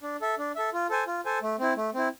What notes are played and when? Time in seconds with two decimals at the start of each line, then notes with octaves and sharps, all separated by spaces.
0.03 D4
0.21 A4 E5
0.38 D4
0.56 A4 E5
0.73 F4
0.90 A4 C5 G#5
1.07 F4
1.25 A4 C5 G#5
1.42 A3
1.59 C4 E4
1.76 A3
1.94 C4 E4